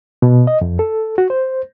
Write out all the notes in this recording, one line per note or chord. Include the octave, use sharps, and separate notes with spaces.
B2
D#5
F2
A4
F#4
C5